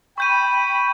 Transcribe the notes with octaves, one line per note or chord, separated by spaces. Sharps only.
G5 B5 C#6 G6 D#7